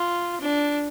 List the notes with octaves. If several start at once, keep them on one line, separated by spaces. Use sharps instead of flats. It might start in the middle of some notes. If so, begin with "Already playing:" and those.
Already playing: F4
D4